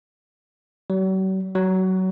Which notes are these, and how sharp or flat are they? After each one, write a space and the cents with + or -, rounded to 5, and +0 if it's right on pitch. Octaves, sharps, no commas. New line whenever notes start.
F#3 +45
F#3 +20